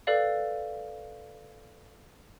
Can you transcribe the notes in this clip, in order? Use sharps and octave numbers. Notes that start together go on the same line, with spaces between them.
A4 B4 D5 F5